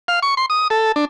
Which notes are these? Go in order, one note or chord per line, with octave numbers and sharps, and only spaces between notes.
F5
C#6
C6
D#6
A4
D4